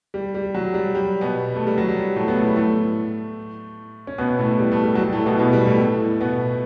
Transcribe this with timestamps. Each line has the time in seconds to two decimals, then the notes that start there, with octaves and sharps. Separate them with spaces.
0.14 G3
0.34 G3
0.54 F#3
0.74 G3
0.95 G3
1.21 B2 B3
1.55 A3
1.67 G3
1.78 F#3
1.88 G3
2.16 A2 A3
2.28 B3
2.36 A2 A3
2.46 G3
2.56 A2 A3
4.07 C#4
4.18 B2 B3
4.38 A2 A3
4.59 G3
4.72 A3
4.84 G3
4.95 F#3
4.99 G3
5.12 A2 A3
5.26 B2 B3
5.39 B2 B3
5.53 G3
5.66 A2 A3
5.80 A2 A3
6.21 B2 B3